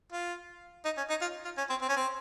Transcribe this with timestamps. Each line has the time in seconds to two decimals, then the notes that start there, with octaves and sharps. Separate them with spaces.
0.12 F4
0.85 D#4
0.97 C#4
1.09 D#4
1.21 F4
1.44 F4
1.57 C#4
1.70 C4
1.81 C4
1.89 C#4
1.96 C4